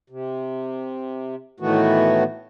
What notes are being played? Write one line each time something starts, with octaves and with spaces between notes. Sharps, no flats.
C3
A2 D#3 E3 A3 B3 F#4